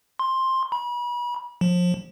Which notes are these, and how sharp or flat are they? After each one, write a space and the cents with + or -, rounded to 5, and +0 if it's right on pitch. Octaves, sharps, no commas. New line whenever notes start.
C6 +10
B5 -35
F3 +30